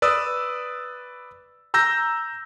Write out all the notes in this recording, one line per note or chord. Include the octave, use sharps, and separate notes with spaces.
B4 D5 D#6 E6
A#5 E6 G6 A#6